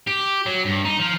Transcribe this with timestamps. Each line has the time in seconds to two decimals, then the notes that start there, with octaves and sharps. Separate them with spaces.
0.07 G4
0.46 F#3
0.65 G2
0.85 D#4
1.00 F3